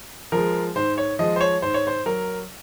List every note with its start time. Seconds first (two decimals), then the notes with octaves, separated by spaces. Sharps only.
0.32 F3 G#3 A#4
0.75 G#2 C5
0.98 C#5
1.19 F3 G#3 D#5
1.36 C5
1.41 C#5
1.62 G#2 C5
1.74 C#5
1.87 C5
2.06 F#3 A#4